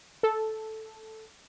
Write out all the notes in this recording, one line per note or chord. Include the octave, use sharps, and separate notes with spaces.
A4